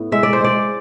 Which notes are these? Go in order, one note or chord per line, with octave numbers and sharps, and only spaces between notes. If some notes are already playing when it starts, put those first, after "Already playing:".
Already playing: A2 B3
G#3 E5
D5
C5
G#3 D5